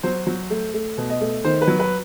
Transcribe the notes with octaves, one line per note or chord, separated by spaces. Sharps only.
F#3 C5
F#3
A3
A3
B2
D#5
A3
D#3 C5
B4
F#3
B4